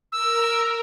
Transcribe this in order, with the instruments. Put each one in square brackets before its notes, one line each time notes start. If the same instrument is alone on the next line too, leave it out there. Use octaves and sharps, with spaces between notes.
[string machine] A#4 [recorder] E6